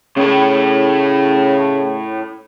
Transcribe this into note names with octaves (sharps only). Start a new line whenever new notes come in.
A2 C#3 A3